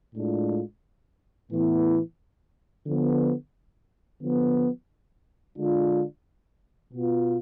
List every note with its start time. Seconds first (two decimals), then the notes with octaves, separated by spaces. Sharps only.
0.15 A2 G#3 D4 F4
1.51 A2 E3 B3 E4
2.86 D3 F3 B3
4.22 D3 F3 B3
5.56 D3 G#3 D4 F4
6.92 B2 B3 F4